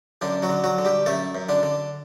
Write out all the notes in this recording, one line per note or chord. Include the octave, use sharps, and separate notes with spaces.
F#2 D3 D4
F#3 F#4
D3
F#3 F#4
D3
G3 G4
F#2 A3 A4
F#2
D3 D4
D3